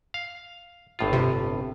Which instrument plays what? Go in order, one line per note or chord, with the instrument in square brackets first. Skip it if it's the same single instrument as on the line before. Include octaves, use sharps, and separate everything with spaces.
[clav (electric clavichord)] F5
G1 A2 F4
[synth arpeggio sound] C3